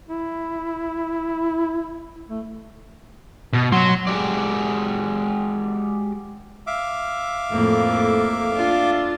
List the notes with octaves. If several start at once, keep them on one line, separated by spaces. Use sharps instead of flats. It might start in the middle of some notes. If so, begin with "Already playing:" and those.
E4
A3
B2
F#3 C6
G#3 F#4 G4 D5
E5 F5 D6
F2 A2 A#3
D4 F4